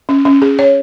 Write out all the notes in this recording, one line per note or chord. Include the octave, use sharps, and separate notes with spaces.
C#4
C#4
G#4
C#5